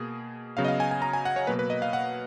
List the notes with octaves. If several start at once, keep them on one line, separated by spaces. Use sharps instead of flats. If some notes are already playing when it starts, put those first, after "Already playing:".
Already playing: B2 A#3 G#4
C#3 F#3 B3 F5
D#5
F5
G#5
G#5
A#5
G#5
F#5
C#5
B2 F#3 A#3 B4
B4
D#5
F5
F#5